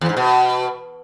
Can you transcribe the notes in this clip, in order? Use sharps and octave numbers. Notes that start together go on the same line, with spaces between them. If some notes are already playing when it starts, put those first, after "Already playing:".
E2
G#2
B2